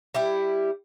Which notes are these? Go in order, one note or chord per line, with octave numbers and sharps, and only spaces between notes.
G3 E4 G4